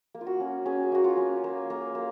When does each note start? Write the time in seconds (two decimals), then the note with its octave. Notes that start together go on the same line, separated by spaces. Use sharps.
0.15 A#3
0.21 F4
0.27 F#4
0.40 C#4
0.66 C#4 G#4
0.92 A#3 F#4
1.04 F4
1.17 C#4
1.44 A#3
1.70 A#3
1.95 A#3